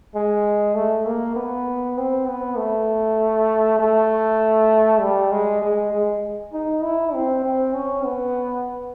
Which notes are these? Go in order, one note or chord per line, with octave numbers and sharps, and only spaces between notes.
G#3
A3
A#3
B3
C4
B3
A3
A3
G3
G#3
G#3
G#3
D#4
E4
C4
C4
C#4
B3